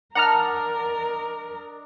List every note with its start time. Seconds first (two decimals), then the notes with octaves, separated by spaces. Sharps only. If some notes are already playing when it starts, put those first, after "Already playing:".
0.15 D4 A#4 D#5 F#5 A5 A#5 F6